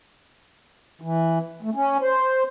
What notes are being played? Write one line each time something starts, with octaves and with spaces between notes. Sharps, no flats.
E3
A3
C#4
C5